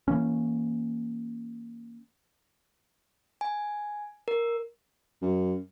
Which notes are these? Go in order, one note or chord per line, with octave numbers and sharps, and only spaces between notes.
E3 A#3 C#4
G#5
A#4
F#2